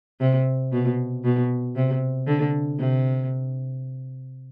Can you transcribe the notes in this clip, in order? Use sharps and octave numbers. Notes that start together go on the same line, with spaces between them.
C3
B2
B2
C3
D3
C3